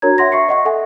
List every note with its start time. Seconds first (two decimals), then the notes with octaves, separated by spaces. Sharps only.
0.02 D4 F#4 A#4 C#5 A#5 G#6
0.18 E5 F#5 C6 A#6
0.32 E5 C#6 C7 C#7
0.49 D#5 F#5 C#6
0.65 A4 E5 F#5 G#5